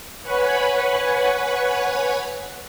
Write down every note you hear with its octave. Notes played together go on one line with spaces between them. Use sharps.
B4 C#5 F#5 G#5 B5